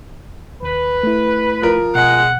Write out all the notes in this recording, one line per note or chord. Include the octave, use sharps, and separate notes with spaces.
D#2 B4
A3 E4
F3 A#4
B2 G#3 F#5